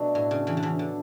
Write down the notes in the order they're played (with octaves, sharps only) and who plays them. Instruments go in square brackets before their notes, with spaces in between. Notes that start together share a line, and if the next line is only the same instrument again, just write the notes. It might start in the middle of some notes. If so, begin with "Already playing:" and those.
Already playing: [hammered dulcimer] B2 F#3 A3 D4
[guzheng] A2
C#3
C#3 E3
D3
C#3 E3
D3